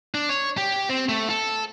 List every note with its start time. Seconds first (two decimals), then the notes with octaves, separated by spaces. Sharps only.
0.15 D4
0.29 C#5
0.57 G4
0.89 C4
1.09 A3
1.30 A4